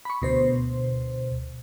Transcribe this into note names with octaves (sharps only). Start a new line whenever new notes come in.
B5 C#6
D2 B2 C5